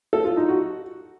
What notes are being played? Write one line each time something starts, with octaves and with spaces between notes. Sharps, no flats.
A4
F4
D#4
F#4